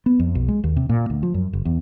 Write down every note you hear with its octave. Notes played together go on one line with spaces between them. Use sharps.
B3
F2
B1
G#3
D#2
C3
A#2
D2
F3
F#2
F#1
E2